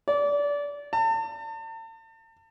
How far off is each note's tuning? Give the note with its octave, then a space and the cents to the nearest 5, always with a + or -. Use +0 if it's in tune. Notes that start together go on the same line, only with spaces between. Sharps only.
D5 -25
A5 +40